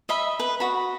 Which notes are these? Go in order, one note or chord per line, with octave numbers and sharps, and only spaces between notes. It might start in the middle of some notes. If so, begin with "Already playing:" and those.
D#5 E5 B5
B4
F#4 B5